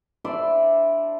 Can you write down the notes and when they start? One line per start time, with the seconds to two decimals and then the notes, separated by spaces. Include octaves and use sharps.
0.24 D4 E4 C5 D5